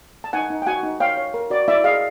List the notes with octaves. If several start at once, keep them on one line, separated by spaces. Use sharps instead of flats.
A5
D#4 F#5 G#5
D#4
G5
F#4 F#5 G#5
D#4
C#5 F5 G5
C#5
A#4
F#4 D5
E4 D5 E5
G#4 D#5 F5